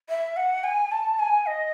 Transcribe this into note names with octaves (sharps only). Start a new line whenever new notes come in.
E5
F#5
G#5
A5
G#5
D#5